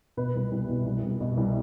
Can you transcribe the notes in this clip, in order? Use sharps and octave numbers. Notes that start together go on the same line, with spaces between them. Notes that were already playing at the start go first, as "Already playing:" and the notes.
B2 B4
C2 B4
C2
B2
C2
C2
B2
C2